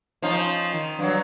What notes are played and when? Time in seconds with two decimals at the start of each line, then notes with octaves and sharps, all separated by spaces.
0.22 F3 C#4 D#4
0.73 D#3
0.99 G2 F#3